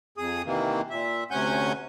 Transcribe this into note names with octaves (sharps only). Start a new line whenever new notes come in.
F2 G#4 D#6
C3 D#3 E3 A#3
A#2 E5
D2 C3 C#4 F#5 G#5 G6